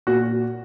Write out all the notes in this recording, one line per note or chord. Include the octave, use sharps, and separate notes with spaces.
A#2 F#4